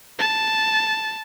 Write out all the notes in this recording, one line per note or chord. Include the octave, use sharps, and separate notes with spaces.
A5